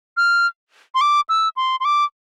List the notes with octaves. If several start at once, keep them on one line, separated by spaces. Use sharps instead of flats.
F6
C6
D6
E6
C6
C6
D6